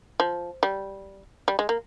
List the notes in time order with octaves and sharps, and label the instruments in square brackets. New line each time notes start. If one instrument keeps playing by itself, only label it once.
[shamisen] F3
G3
G3
G#3
A#3